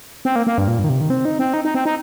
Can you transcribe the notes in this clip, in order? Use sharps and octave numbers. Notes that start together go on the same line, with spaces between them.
C4
A#3
A#3
G2
A#2
G2
D#3
C3
D#3
C4
D#4
C4
D#4
D#4
C4
D#4